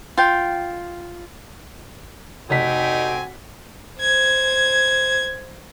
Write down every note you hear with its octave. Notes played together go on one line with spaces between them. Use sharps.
F4 G5
F1 C4 D#4 F#4 G4 G#5 B6
C5 G#6